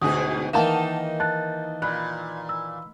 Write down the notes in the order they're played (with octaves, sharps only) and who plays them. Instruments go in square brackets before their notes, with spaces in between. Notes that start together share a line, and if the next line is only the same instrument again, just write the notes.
[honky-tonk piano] D2 [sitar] G#2 B2 G#4 [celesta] D#6
[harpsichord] D#3 E3 A#3 [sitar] D#4 [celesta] F5 [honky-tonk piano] F#5 A5 E7
[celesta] A5 F#6 [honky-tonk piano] A6
[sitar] A#2 [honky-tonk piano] B5 [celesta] F#6
[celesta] E6